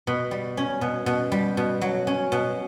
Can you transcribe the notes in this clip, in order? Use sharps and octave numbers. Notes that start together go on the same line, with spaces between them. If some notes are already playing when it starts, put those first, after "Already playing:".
B2
G3
C#4
B2
B2
G3
B2
F#3
C#4
B2